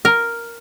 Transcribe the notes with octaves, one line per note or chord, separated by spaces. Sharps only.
A#4